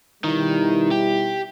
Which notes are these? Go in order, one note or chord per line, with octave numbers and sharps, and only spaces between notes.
B2 D#3 G3 E4
G4